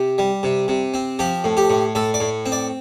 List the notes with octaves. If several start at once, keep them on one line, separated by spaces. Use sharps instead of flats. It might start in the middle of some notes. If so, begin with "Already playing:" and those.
Already playing: C3 G4
G3
C3
C3
C4
F3 G4
A2
G4
A2
A2 A4
D5
A2
C4
D5